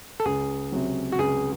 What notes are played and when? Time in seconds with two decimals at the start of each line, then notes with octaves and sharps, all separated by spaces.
0.20 A4
0.25 C#2 G#4
0.72 C3 F#3
1.12 F#4
1.19 C#2 G#4